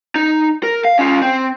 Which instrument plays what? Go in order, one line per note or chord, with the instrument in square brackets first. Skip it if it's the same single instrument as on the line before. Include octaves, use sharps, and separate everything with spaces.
[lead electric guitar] D#4
A#4
F5
C#4 F4
C4